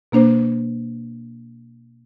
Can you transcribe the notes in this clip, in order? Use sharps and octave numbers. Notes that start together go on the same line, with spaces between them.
B2 A#3 D4 C5